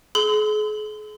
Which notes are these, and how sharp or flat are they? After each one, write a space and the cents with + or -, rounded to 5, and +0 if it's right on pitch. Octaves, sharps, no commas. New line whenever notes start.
G#4 +40 C6 -40